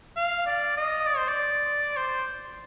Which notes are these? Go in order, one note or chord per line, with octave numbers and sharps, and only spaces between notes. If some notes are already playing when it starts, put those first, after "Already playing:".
F5
D5
D#5
D5
C5
D5
C5